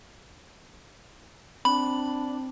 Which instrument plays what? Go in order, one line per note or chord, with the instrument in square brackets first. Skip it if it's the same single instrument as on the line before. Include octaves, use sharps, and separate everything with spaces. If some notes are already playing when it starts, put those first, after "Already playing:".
[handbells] C4 [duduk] D4 [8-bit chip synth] B5